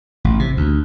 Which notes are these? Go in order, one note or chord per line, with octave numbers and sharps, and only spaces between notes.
A1
C3
D2